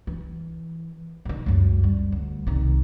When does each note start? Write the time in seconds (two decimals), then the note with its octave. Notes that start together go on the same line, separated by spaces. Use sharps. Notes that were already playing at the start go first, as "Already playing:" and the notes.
0.07 E3
1.25 G2 D#3
1.46 C#2 F#2
1.84 G3
2.12 D2
2.47 C2 D#3